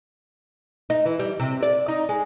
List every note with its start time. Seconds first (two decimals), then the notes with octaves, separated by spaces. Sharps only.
0.90 D#4
1.05 E3
1.19 G3
1.40 C3
1.63 D5
1.88 D#4
2.09 G#3